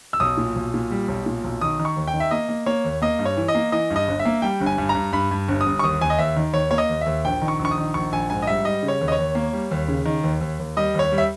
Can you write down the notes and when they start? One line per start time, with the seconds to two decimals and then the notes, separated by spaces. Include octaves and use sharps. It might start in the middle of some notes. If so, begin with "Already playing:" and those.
0.13 E6
0.20 B1 D#6
0.37 A#2
0.56 B1
0.74 A#2
0.91 G3
1.08 B1
1.26 A#2
1.44 B1
1.61 D#3 D#6
1.79 D#3
1.85 C#6
1.97 D#2
2.08 G5
2.14 D#3
2.20 E5
2.31 A#3 D#5
2.49 A#3
2.66 A#3 C#5
2.85 D#2
3.02 A#3 D#5
3.19 G2
3.25 C#5
3.37 E3
3.48 D#5
3.55 A#3
3.72 E3 D#5
3.90 G2
3.96 D#5
4.08 G1
4.19 E5
4.25 A#3
4.42 G3 G5
4.61 G1
4.66 G#5
4.78 G2
4.89 A#5
4.95 G2
5.13 G2 B5
5.31 G2
5.48 G1
5.61 D#6
5.66 G1
5.79 C#6
5.83 D#2 D#6
6.01 D#2 G#5
6.10 D#5
6.18 D#2 E5
6.36 D#3
6.53 D#2 C#5
6.71 A#3 C#5
6.78 D#5
6.89 D#2
7.01 D#2 E5
7.24 A#1 G5
7.42 D#3
7.48 C#6
7.59 A#1
7.65 C#6
7.71 D#6
7.78 D#3
7.94 A#1 C#6
8.12 A#1 G#5
8.30 G#2 G#5
8.42 D#5
8.47 G3 E5
8.65 G3 D#5
8.83 C#3
8.88 C#5
9.01 D#2
9.08 D#5
9.12 C#5
9.19 D#2
9.35 A#3
9.53 G3
9.71 D#2
9.88 C#3
10.05 D#3
10.24 D#2
10.41 D#2
10.59 D#2
10.77 G3 D#5
10.94 D#2 C#5
11.12 G3
11.18 E5